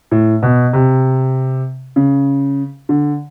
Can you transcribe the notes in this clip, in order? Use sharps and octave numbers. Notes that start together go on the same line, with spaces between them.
A2
B2
C3
C#3
D3